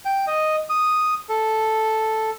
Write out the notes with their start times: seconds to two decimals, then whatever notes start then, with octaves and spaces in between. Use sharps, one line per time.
0.05 G5
0.27 D#5
0.70 D#6
1.29 A4